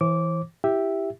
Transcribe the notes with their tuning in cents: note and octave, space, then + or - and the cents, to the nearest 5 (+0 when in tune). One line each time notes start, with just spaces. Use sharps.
E3 +0 C5 +40 D6 -15
E4 +0 G4 +0 E5 +0